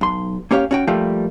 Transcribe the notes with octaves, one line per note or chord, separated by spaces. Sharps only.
B1 C6
A#3 C#4 G4 C#5 F5
C#4 F#4 G5
F3 G3 A3 A#3 F4 G4